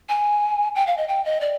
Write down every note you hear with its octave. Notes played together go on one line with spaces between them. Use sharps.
G#5
G5
F5
D#5
G5
D#5
D5